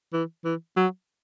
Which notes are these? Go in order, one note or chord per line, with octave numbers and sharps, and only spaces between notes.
E3
E3
F#3